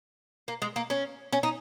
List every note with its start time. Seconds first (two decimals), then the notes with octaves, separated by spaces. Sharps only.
0.48 A#3
0.62 G#3
0.76 A#3
0.90 C#4
1.33 C#4
1.43 D#4